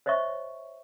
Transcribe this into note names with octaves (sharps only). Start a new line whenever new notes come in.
C5 C#5 D#5 E5 C#6